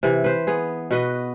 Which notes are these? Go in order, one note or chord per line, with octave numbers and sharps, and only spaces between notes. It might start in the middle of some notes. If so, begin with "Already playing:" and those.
C3 E3
B4 C5
B3 G#4
B2 F#4 B4 D#5